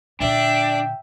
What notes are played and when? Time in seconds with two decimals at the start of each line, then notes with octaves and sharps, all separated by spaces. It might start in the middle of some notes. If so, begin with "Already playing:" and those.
0.20 A#2 D3 D4 E5 G5